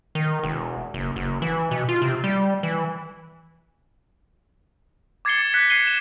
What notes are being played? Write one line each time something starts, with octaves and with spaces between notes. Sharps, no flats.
D#3
E1
F#1
F#1
E3
B2
F4
C3
G3
E3
D6 G#6 A6 C7 C#7 G7
F#6 G#6 B6 C#7
G#6 C7 C#7 D#7 G7
C7 E7